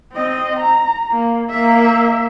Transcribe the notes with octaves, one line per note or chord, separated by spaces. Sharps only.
C4 D#5
A#5
A#3
A#3 E5